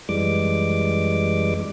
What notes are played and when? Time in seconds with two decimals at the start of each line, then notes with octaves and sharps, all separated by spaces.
0.09 F#2 E3 G3 G#3 D6